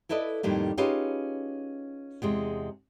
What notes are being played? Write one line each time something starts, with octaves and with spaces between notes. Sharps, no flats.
E4 A4 B4 D5 D#5
F2 A2 D#3 G3 A#3
C#4 D#4 F4 G4 G#4 B4
E2 C3 G#3